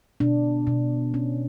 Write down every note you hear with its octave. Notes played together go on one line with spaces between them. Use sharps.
B2 D4
B2
C#4